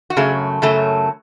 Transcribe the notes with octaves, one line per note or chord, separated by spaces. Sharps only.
F#4
F#2 C#3 F#3 A3 G#4
F#2 C#3 F#3 A3 A4